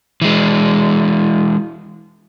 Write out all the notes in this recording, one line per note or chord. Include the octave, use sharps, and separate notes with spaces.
E3 G#3